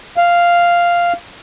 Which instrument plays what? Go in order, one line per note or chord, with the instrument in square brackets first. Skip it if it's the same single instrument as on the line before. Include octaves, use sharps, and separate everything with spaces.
[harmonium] F5